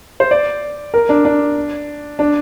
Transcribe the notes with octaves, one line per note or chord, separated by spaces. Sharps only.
C5
D5
A#4
D4
D4
D4